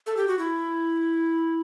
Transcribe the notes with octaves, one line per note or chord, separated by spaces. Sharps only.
A4
G4
F#4
E4